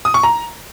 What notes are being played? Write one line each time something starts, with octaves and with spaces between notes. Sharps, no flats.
D#6
C#6
A#5